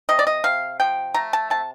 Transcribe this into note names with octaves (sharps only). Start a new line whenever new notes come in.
C3 D#5
D5
D#5
C3 F5
F3 G5
A3 A#5
A5
C3 A5